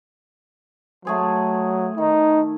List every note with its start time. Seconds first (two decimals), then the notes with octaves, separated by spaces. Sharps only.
1.05 F#3 A3 G#4 C5
1.98 D#3 D#4